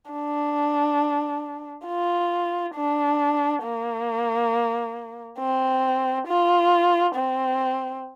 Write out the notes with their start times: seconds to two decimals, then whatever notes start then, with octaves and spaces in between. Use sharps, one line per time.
0.11 D4
1.87 F4
2.75 D4
3.64 A#3
5.39 C4
6.28 F4
7.15 C4